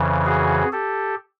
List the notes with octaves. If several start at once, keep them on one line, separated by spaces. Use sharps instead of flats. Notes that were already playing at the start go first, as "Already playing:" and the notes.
Already playing: F2 C#3 E3
F#4 G#4
G4 A4